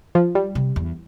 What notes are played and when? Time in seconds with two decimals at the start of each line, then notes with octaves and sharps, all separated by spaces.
0.15 F3
0.35 G3
0.55 C3
0.76 E2